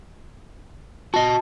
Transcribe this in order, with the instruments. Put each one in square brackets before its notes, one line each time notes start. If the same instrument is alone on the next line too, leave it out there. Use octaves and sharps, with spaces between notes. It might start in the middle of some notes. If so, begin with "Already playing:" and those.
[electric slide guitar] F#4 D#5 [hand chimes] A5